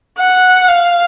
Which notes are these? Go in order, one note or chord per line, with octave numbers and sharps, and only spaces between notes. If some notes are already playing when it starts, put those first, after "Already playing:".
F#5
F5